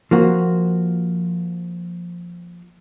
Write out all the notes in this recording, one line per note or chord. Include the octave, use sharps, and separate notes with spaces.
F3 A#3 F#4